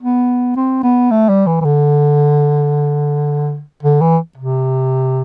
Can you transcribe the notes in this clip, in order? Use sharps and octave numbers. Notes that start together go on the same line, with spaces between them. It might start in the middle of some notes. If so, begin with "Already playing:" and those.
B3
C4
B3
A3
G3
E3
E3
D3
D3
E3
C3